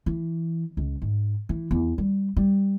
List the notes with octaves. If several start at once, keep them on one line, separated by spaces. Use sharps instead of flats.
E3
C#2
G#2
E3
E2
G3
G3